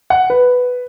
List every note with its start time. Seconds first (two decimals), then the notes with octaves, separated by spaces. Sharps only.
0.10 F#5
0.30 B4